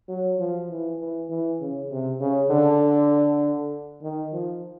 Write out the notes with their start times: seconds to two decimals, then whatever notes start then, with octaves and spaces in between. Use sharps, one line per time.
0.09 F#3
0.39 F3
0.69 E3
0.99 E3
1.30 E3
1.61 C#3
1.91 C3
2.20 C#3
2.51 D3
4.03 D#3
4.33 F3